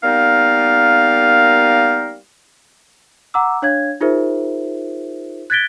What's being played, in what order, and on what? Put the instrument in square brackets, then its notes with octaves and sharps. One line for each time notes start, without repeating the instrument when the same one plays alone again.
[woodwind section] G3 A#3 B3 D#4 A#4 F5
[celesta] F#5 A#5 D6 E6
D4 C#5 F5 G#6
D#4 F4 G#4 A#4 C5 E5
F#6 G#6 A6 B6 D7 G7